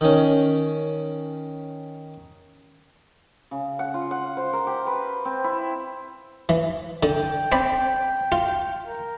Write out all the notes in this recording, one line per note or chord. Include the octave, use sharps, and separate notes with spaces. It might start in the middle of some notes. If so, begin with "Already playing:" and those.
D#3 C#4
C#3
F#5
F4
F#5
C5
A#4
G4
B4
C4
E4
E3
D3 G5
C4 D5 B5
F4
A#4